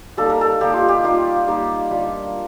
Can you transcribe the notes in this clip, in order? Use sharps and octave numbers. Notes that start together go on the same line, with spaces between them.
G3 A#3 D#4 A4
A#4
A4
G3 A#3 D#4 G4
F4
G4
G3 A#3 D#4 F4
G3 A#3 D#4
G3 D4 F4